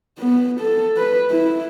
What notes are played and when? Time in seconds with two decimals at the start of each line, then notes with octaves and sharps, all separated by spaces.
0.19 B3
0.61 A4
0.97 B4
1.31 E4